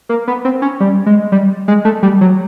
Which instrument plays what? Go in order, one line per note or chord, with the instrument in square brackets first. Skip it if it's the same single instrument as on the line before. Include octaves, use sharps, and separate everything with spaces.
[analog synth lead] A#3
B3
C4
C#4
G3
G#3
G3
G#3
A3
G3
F#3